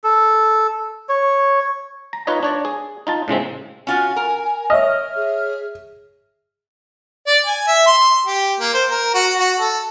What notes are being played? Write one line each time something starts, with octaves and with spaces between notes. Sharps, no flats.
A4
C#5
A#5
D#4 F4 B4 C#5 D#5
D4 C#5 D5
G#4
D#4 F4 A5
A2 C#3 G#3 C4
C#4 F4 F#4 G#5
A#4
C#5 D#5 E5 F6
G#4
D5
G#5
E5
C6
G4
A#3
C5
A#4
F#4
F#4
A4